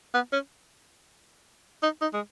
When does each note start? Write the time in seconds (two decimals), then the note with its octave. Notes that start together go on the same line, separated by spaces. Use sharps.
0.14 B3
0.33 C#4
1.83 D#4
2.02 D#4
2.14 G#3